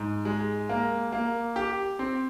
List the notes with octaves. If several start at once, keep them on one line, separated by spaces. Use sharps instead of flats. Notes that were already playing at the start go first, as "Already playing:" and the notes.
Already playing: G#2
G#3
A#3
A#3
G4
C4